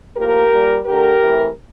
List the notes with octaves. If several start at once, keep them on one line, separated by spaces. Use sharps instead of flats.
A2 F3 A#3 G4 A#4
A#2 G3 A#3
D3 A3 G4 A#4
C3 E3 A3